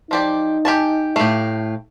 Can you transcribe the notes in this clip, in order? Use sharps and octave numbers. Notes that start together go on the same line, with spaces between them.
F3 D#4 G4 D5
G4 G#5 A5
A2 A3 G4 F5